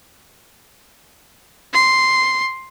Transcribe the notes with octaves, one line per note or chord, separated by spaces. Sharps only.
C6